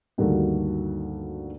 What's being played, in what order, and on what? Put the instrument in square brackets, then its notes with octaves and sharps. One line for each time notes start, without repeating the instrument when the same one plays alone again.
[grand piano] D2 G2 D#3 A#3 F#4 A4